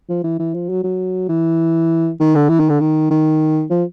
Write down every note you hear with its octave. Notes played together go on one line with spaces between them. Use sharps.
F3
E3
E3
F3
F#3
F#3
E3
D#3
D3
E3
D#3
D3
D#3
D#3
F3